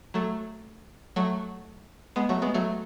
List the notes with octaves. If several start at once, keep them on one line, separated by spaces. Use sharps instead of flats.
F#3 A3
F#3 A3
G#3 B3
F#3 A3
G#3 B3
F#3 A3